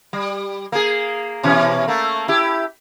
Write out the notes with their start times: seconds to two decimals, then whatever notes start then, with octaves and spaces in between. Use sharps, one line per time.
0.13 G3
0.72 A#3 G#4
1.43 B2 E3 C#4
1.88 A3 A#3
2.28 E4 G4